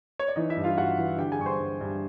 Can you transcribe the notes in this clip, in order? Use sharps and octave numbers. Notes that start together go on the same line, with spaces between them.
C#5
D5
E3 D#4 D#5
E4 E5
G2
F4 F5
G2 F#4 F#5
E3
D3 G4 G5
G#4 G#5
G2 C#6
C5 C6
G2
G2